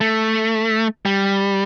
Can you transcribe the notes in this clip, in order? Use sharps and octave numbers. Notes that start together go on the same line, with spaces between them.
A3
G3